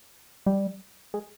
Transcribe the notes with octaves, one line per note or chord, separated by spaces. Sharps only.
G3
G#3